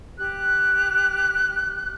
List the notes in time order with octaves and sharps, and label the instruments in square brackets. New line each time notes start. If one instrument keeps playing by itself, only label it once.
[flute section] G4 F#6